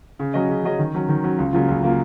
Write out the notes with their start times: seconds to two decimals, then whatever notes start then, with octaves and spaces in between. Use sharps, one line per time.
0.19 C#3
0.34 F#3 C#4 G#4 D#5
0.49 C#3
0.64 F#3 C#4 G#4 D#5
0.79 D#3
0.94 F#3 C#4
1.09 D#3
1.23 F#3 C#4
1.38 C#2
1.53 C#3 F#3 A#3 F4
1.69 C#2
1.83 C#3 F#3 A#3 F4